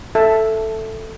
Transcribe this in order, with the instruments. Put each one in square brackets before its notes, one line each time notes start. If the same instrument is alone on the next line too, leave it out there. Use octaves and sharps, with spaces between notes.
[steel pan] A4 E5 A5